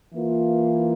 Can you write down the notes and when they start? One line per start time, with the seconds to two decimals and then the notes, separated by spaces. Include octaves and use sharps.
0.14 E3 A#3 F4